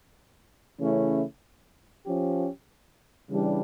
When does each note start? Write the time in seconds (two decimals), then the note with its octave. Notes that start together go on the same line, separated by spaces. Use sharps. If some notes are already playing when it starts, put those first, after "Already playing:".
0.79 C#3 E3 A3 C#4 E4
2.04 F3 C#4 G4
3.29 C#3 E3 G3 D4